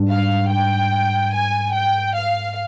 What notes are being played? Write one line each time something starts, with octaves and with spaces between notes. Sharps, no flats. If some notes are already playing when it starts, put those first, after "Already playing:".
Already playing: G#2 G3 D4
F5
G5
G#5
G5
F5